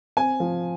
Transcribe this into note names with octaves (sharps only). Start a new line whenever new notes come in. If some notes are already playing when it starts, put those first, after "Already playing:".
C4 G#5
F3